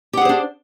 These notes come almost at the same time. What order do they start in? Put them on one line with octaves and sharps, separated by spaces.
G4 F#5 G#4 C5 D4